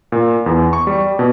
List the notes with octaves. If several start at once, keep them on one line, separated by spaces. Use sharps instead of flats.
A#2
E2
C#6
G3
B2